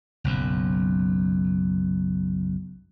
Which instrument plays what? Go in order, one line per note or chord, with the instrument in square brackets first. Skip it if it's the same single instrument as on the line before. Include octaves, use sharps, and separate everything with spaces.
[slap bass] F#1 B1 F#2